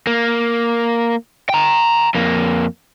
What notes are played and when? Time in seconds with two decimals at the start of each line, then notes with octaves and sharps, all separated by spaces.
0.07 A#3
1.49 G5 A#5
2.15 F2 A#3